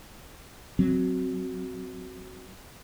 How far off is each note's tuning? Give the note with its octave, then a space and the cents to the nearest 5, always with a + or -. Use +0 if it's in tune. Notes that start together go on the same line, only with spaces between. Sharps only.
F#3 +0 C4 +0